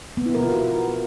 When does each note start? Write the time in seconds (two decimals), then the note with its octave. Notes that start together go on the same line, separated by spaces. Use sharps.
0.17 B3
0.26 E4
0.34 A#4
0.43 F4
0.52 F#4